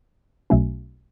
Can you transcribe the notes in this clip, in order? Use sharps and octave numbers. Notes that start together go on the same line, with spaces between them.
B1 B2 F#3 A3 C#4